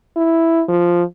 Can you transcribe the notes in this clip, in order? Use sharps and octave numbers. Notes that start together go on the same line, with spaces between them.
E4
F3